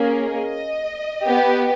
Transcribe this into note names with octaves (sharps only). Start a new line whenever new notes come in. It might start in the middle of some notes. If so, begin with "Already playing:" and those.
Already playing: A#3 C#4 G#4
D#5
B3 G4